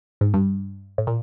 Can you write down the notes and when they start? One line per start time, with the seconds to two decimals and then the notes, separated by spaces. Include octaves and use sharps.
0.21 G#2
0.34 G2
0.98 A2
1.07 A#2